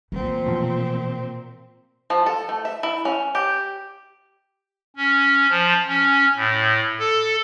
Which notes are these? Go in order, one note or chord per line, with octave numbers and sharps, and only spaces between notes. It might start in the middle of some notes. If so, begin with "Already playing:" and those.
A#2 E3 A3 C4
B2 F3
F3
A4
A3
E5
E4
C#4
G4
C#4
F3
C#4
A2
A4